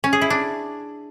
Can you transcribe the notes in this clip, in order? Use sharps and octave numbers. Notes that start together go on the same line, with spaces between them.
C#4
G#4
E4
D4